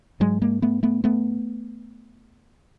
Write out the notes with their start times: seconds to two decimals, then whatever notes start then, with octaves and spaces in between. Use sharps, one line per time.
0.20 G#2 F#3 G#3
0.42 G#3 A#3
0.62 A3 B3
0.83 A3 B3
1.04 A3 B3